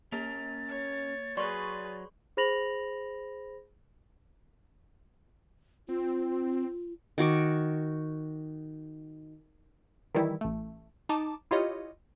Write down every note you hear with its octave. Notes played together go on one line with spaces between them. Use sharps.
A#3 C#4 A#4 A6
C#5
F#3 G#4 B4 D5 C6 C#6
G#4 C5 B5 A#6 F7 F#7
C4 F4
D#3 F#4 C#6 D6
D#3 E3 G3 E4
A1 A3
D#4 A5 D6
E4 F4 G4 C#5 D#5